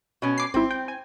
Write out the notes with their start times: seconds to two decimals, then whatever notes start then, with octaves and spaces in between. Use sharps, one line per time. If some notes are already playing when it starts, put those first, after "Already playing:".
0.22 B2 C#4
0.38 D6 C7
0.54 G#1 C4 E4
0.71 G5
0.88 G#5